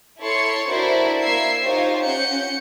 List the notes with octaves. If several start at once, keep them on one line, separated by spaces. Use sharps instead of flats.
E4 A4 C#5 C6 C#7
D4 E4 F#4 A#4 C5 D5
A#3 C5 E5 E6 G#6 C7
D#4 F4 G4 C5 C#5
C#4 F#5 G6 C#7